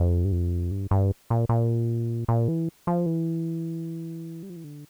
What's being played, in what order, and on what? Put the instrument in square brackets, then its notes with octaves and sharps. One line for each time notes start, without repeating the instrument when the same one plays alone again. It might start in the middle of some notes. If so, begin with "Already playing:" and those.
Already playing: [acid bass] F2
G2
F2
G2
G2
A#2
A#2
A#2
E3
F3
E3
G3
F3
E3
D3